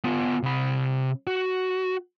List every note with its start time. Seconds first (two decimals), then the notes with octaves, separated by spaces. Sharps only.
0.04 B3 F4
0.43 C3 B5
1.27 F#4